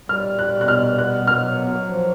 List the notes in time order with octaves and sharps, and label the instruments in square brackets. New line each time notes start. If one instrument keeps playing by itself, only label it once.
[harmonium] G3 [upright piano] F6
[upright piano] F#6
[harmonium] B2
[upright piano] F#6
F6
[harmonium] B3 [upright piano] F#6
[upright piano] F6
[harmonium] F#3
F3